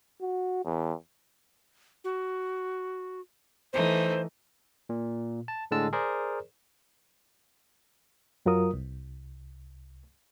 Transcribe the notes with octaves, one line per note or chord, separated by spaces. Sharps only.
F#4
E2
F#4
E3 A3 D#4 C5
A#2
A5
A2 D3 G#3 A5 E6
G#4 A#4 C5 D5
F#2 F#3 F4 A#4 D#6
C2